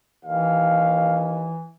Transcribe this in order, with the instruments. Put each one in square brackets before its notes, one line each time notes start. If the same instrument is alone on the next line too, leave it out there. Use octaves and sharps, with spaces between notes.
[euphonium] D#2 [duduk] E3 [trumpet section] F5